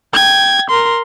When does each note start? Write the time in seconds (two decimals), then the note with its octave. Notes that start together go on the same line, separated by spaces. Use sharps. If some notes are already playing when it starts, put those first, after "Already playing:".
0.14 G5 G#6
0.70 A#4 C6